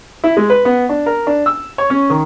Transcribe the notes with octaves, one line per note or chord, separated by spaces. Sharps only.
E4
G#3
B4
B3
D4
A#4
D4
E6
C#5
C#4
D#3